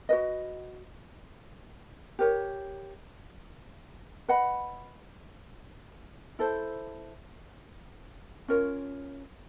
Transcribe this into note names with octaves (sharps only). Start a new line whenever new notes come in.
F#4 B4 D#5
G4 A#4 C#5
B4 D#5 F#5 B5
E4 A4 C5
C#4 F4 A#4 C#5